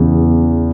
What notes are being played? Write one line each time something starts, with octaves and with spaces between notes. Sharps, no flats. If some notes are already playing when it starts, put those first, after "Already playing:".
Already playing: E2 C#3 E3